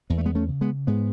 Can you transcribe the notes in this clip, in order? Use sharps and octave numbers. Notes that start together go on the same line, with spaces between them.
E2 B3
A3
G#3 B3
A3 C#4
C#3
G#3 B3
G#2 G#3 B3